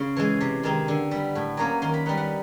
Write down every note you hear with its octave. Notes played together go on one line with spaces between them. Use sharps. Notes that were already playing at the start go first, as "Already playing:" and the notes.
Already playing: C#3 C6
E3 G#3
C3
D#3 G#3 C4 D#4
D3
G3 B3
A2
F#3 A#3 C#4
D#3 C6
B5
G3 B3 D#4 F#5
F#5